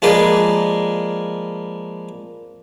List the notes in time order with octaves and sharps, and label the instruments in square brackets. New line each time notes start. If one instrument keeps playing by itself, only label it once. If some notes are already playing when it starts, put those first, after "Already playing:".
[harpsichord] F3 G#3 A#3 G#4 B4 D5